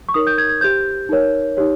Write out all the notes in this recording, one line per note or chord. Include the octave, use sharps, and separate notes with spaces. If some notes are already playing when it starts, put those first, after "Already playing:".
C#6
D#4 A#4 C#5 D#6
G6
G#6
G#6
G4 C5 G6
D#4 A#4 C#5
D#4 G4 C#5